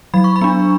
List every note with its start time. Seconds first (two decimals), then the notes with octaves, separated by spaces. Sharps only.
0.14 F#3 B5
0.24 C#6
0.36 B5
0.41 B3 D4